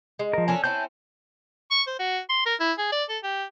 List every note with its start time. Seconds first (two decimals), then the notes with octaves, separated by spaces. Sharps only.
0.19 G#3
0.33 F3 A#4
0.48 C#4 D4 A4
0.64 C4 C#4 E4 A5 G6
1.71 C#6
1.87 C5
1.99 F#4
2.29 C6
2.46 A#4
2.60 E4
2.78 G#4
2.92 D5
3.09 A4
3.23 G4